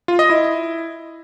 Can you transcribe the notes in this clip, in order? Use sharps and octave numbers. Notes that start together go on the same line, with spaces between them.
F4
D#5
E4